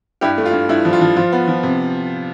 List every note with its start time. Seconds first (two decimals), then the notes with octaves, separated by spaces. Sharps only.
0.21 G2 E4 G4
0.38 A3
0.46 F4
0.53 G2
0.69 G2 E4
0.85 F3
0.93 F4
1.01 F3
1.16 F3 F4
1.32 B3
1.48 F3
1.63 C3